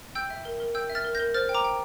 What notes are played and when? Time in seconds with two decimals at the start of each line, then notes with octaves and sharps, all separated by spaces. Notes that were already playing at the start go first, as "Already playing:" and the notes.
0.15 G5 E6 G6
0.30 E5
0.45 A#4
0.60 A#4
0.75 G5 E6 G6
0.90 E5
0.95 F6 A6
1.05 A#4
1.15 A#4 G6 A#6
1.34 C5 F6 A6
1.49 G5
1.55 A#5 D6
1.64 G5